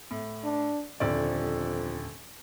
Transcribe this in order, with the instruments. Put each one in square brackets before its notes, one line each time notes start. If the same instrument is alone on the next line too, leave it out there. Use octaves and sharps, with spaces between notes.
[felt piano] A2
[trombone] D4
[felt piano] D#1 D3 D5 [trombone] F2